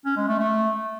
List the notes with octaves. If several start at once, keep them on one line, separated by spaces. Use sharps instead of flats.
C#4
G#3
A3
A3